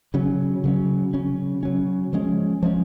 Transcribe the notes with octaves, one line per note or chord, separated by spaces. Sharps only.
C#3 F#3 C#4
C#3 F#3 C#4
C#3 F#3 C#4
C#3 F#3 C#4
F3 G#3 C#4
F3 G#3 C#4